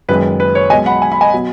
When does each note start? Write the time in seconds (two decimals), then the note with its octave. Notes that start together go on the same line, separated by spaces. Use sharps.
0.09 F#1 F#2 D#3 G#3 B4
0.40 B4
0.55 C#5
0.70 B1 B2 G#3 D#5 G#5
0.86 F#5 B5
1.02 G#5
1.12 B5
1.21 D#5 G#5
1.34 B2 F#3